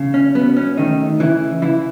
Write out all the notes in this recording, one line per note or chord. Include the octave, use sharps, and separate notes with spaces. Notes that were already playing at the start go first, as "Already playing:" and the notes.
Already playing: C#3
C#4
F#3 B3
C#4
D#3 A3 D#4
C#3 E3 E4
C#3 E3 E4